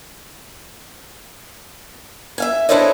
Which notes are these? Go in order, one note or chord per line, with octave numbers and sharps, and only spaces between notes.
E5 F5 G#5
D4 E4 A4 C5 C#5 D#5